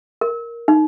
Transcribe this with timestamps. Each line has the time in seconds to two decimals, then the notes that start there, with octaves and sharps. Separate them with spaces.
0.21 A#4
0.68 D#4